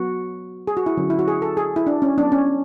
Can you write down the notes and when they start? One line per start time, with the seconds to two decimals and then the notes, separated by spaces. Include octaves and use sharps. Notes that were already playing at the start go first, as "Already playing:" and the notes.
Already playing: F#3 B3 F#4
0.67 G#4
0.77 F#4
0.86 E4
0.97 D3 F#3 C#4
1.10 E4
1.19 F#4
1.28 G#4
1.42 A4
1.57 G#4
1.76 E4
1.87 D4
2.02 C#4
2.17 F#3 B3 D4
2.32 C#4